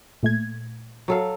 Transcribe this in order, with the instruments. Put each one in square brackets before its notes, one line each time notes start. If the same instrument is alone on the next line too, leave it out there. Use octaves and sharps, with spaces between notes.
[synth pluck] A#2 A3 G#6
[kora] F#3 A4 F5